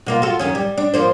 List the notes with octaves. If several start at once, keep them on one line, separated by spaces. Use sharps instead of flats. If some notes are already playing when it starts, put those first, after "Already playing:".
B2 A#3 F4
F4 F#4 A4
F#2 D#3 C#4
G3
D4
F3 A#3 C5